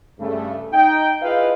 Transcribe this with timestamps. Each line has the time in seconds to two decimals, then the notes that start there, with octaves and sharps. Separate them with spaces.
0.19 G2 C#3 A3
0.73 D#4 G5
1.22 E4 F4 G#4 B4 D#5 F5